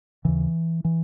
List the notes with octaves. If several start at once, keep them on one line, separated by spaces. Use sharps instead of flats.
D#2 C#3 E3
E3